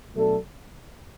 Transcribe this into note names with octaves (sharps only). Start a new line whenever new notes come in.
B2 F#3 A3 D4 A4